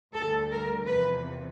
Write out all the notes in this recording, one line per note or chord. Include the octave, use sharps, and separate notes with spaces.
D2 D3 G3 A4
A#4
E2 C3 F3 B4